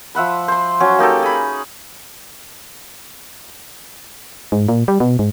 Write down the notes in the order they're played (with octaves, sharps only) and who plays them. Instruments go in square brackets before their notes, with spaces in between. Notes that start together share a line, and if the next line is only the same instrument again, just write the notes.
[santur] F3 E5 F#5 B5
C5 C6
F#3 C#4
A#3 D#4 G4 A4
G#4 B5
[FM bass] G#2
A#2
G3
B2
G#2